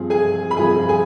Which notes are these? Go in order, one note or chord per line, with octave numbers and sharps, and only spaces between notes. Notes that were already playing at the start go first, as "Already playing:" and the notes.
Already playing: G2 F3 C4 G#4
G#4 G#5
B5
G2 F3 C4 G#4 G#5
G#4 G#5